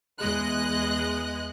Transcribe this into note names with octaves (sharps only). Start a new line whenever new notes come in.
E2 G#3 D#5 F#6